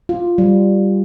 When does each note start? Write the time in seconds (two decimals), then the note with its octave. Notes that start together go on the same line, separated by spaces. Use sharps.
0.09 F4
0.38 G3